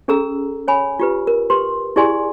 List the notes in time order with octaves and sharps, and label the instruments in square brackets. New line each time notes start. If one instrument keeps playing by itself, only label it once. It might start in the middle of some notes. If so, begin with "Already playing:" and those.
[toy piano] C#4 G#4 A4 A#5 E6
C#5 G#5 B5
F4 G4 B4
A#4
G4 B4 C6
E4 G4 G#4 D5 G#5 C6